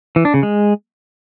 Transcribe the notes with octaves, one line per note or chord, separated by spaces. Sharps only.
E3
D4
C#3
G#3